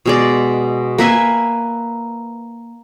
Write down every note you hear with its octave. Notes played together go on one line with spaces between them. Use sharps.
B2 G#3 D5
A#3 B4 E5 G#5